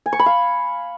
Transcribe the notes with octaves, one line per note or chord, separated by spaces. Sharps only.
G#5
C#6
B5
F5